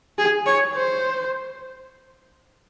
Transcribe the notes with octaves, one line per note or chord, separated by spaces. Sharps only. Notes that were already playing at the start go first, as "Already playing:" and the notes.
G#4
C#5
C5